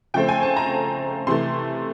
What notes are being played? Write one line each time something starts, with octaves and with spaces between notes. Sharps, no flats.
C#3 F3 A3 C4 G5
G#5
A5
A#5
C3 E3 A3 C6